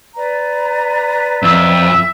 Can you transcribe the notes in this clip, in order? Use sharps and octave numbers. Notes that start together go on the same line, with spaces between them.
B4 D5 A#5
F2 E5